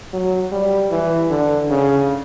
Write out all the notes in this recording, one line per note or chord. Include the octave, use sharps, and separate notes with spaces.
F#3
G3
E3
D3
C#3